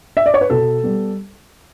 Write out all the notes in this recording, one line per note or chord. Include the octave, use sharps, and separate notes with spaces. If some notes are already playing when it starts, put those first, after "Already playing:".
E5
D5
C#5
B4
B2 A4
G3 B3